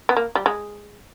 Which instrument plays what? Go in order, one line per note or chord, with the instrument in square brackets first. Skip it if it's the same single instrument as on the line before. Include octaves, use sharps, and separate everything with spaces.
[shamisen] B3
A#3
G3
G#3